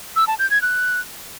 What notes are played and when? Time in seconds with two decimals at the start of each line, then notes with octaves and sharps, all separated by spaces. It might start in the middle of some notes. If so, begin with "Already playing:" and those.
0.16 E6
0.28 A5
0.39 G6
0.50 G#6
0.62 F#6